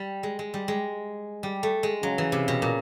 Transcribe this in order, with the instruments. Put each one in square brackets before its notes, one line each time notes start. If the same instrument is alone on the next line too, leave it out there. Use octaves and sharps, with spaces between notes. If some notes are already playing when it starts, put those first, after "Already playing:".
Already playing: [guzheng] G3
G#3
G#3
G3
G#3
G3
A3
G#3
[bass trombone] C#3 [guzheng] F#3
[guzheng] E3
C3
B2
A#2